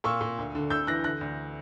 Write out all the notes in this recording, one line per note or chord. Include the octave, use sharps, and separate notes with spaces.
A#2 C#6 E6
A#2
D2
D3
D2 E6 G6
E3 F#6 A#6
D3 F#6 A#6
D2